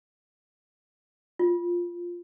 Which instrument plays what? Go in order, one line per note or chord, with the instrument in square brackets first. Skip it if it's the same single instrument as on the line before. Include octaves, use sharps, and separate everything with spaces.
[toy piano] F4